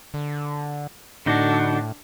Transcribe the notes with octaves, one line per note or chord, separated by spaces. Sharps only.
D3
A2 D3 D4 D#4 F#4